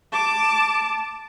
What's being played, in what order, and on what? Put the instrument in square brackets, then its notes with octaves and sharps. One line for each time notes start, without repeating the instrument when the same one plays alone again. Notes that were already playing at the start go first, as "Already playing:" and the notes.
[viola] A5 D6